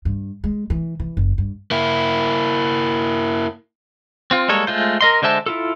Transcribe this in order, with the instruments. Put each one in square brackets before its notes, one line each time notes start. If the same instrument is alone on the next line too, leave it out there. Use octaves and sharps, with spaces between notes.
[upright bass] G2
G#3
E3
E3
F#1
G2
[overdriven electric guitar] A#3 E4
[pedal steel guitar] C4 F4
G3 G#3 A#3 A4 C#5
G#3 A3 F4 C5
A#4 D#5 C6
D3 G#3 C5 E5 A5
E4 F4 A4